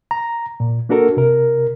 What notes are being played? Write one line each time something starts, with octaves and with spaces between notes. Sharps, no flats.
A#5
A#2
A#3 D4 F#4 A4 A#4
C3 A#4